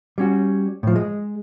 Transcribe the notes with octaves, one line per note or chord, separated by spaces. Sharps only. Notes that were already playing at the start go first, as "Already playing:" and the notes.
G3 C#4 F#4
A2 F3
G#3